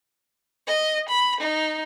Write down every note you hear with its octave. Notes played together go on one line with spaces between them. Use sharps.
D#5
B5
D#4